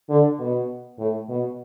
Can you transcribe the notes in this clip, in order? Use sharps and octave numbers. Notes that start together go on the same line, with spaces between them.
D3
B2
A2
B2